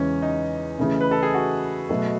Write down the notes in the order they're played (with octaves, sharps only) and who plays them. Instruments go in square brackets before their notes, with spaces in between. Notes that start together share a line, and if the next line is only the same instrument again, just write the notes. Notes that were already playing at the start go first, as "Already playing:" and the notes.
Already playing: [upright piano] E2 C#3 E3 G#3 [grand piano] C#4
[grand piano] D#4
[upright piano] C#3 E3 A3 C#4 E4
[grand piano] B4
A4
G#4
F#4
[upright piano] B2 F#3 A3